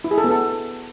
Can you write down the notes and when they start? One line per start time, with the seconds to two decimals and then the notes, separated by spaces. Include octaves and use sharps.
0.04 E4
0.11 G#4
0.18 A4
0.24 B3
0.31 A4